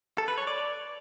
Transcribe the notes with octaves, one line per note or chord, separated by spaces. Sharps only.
A4
B4
C#5
D5